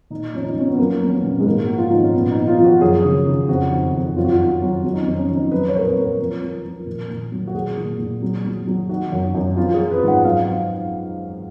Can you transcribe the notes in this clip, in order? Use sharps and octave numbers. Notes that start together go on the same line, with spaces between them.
A#2 D#4
F3 C#4
D#4
F3 C#4
B3
F#3 A#3
F#3
C#4
B3
A#2
G#3
G#2 A#3
F3 F#4
F4
G#2 D#4
C#4
A#2 B3
D#4
F3
F4
F3
F#4
F#2 G#4
C#3
C#3
F2 F#4
D#3
F2
F#2 F4
F#4
F4
D#3
F#3
F#3
D#4
C#4
F2
C#4
F2
D#4
F#3 B4
C#5
A#2 A#4
B4
F#3
A#4
F3
F3
F3
A#2
A#2
F#3
F#4
A#2 G#4
A#2
A#2
F#3
F#3
F#3
D#3 F#4
F#2
F#2
F3 F4
G#4
F3
B4
G#2
F#5
F#3 F5